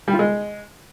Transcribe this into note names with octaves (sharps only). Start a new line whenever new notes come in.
G3
F4
G#3